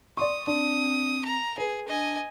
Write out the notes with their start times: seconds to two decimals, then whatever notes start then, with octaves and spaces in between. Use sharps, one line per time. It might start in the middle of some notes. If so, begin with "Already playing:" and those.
0.17 D5 C6 C#6 D#6
0.47 C4 D4 D#6
1.25 A#5
1.58 G#4 B4
1.88 D4 D#5 G#5